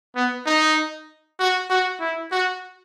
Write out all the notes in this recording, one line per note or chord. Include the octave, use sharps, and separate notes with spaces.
B3
D#4
F#4
F#4
E4
F#4